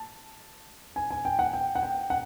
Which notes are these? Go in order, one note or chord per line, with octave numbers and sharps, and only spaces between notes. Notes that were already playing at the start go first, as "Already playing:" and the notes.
Already playing: A5
G#5
G#5
G5
F#5
G5
F#5
G5
F#5